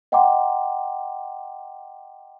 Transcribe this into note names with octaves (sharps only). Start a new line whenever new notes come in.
D#5 F#5 G5 A#5 C6 D6